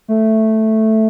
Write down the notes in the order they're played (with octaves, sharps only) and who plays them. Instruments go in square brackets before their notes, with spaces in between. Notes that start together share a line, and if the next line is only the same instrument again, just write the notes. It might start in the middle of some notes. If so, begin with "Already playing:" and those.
[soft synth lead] A3